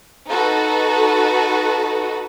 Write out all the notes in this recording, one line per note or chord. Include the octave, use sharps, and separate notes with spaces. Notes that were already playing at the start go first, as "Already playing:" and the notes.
D#4 F#4 A4 B4